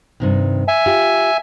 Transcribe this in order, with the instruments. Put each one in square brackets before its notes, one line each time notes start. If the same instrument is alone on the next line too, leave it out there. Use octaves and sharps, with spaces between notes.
[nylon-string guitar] G2 C3 D#3
[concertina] E5 G#5
[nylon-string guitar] F4 G4